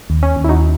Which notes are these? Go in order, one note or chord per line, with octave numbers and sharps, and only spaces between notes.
D#2
C#4
D#2
E4
D#4 F#4